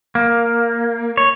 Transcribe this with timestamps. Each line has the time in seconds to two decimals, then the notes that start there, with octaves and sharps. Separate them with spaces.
0.15 A#3
1.17 C#5